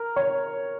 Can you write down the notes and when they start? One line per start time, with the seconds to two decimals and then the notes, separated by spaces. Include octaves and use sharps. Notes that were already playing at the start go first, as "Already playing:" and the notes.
Already playing: A#4
0.16 C#5